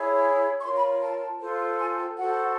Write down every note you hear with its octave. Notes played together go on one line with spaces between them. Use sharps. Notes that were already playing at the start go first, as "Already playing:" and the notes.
Already playing: E4 G#4 C#5
C#6
F4 A#4 C#5 C6
B5
A5
F4 A4 C5
G#5
G5
F#4 A4 C5 F#5